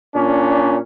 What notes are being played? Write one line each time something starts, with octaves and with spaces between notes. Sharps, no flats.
A#2 C#4 D4